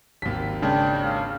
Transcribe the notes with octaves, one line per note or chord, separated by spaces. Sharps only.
G#1 D#2 B6
C#3 G#3 D4 G5
F5